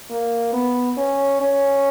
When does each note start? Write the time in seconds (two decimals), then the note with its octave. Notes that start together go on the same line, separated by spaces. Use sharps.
0.10 A#3
0.53 B3
0.97 C#4
1.41 C#4